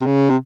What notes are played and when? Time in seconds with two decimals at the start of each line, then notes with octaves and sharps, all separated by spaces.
0.02 C3
0.06 C#3
0.30 C3